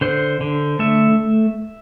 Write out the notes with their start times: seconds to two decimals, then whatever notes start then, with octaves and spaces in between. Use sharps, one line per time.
0.01 D3 C5
0.41 D3
0.79 A3 E5